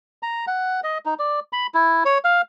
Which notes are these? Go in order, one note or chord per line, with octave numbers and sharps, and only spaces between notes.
A#5
F#5
D#5
D#4
D5
B5
E4
C#5
F5